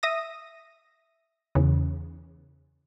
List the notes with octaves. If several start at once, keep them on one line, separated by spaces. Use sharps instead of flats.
E5 D#6 A#6
E2 C#3